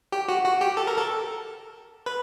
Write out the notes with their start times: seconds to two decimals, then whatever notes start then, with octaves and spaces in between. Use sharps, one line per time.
0.12 G4
0.28 F#4
0.45 F#4
0.61 G4
0.77 A4
0.87 A#4
0.98 A4
2.06 B4